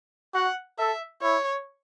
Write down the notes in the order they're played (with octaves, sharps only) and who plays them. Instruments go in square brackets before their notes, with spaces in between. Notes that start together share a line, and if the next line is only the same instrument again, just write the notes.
[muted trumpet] F#4 [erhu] F#5
[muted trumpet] A4 [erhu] E5
[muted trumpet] E4 [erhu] C#5